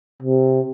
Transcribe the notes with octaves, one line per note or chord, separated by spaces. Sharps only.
C3